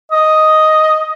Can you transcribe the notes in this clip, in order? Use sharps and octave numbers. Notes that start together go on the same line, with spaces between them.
D#5